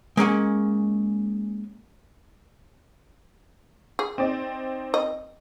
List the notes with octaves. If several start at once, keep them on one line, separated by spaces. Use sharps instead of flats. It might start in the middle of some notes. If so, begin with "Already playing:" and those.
G#3 A#3 C#4 F#5
G#4
C4 D#4 D5
D#5